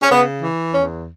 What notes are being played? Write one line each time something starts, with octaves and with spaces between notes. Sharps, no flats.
C#4
C#3 B3
E3
E2 C#4